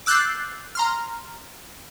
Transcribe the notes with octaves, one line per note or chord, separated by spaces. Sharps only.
D6 E6 F#6 G6 A6 C7
A#5 C6 F6